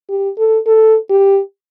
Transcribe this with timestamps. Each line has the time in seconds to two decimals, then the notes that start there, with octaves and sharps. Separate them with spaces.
0.09 G4
0.38 A4
0.67 A4
1.10 G4